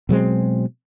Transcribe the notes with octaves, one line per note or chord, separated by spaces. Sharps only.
B2 F#3 G#3 C4